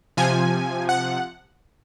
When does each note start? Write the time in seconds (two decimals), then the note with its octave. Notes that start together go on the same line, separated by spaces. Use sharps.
0.17 C3 F3 G#5
0.89 F#5